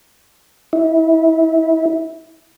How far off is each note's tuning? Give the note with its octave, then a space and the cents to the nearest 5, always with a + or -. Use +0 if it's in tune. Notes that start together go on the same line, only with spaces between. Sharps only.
E4 -25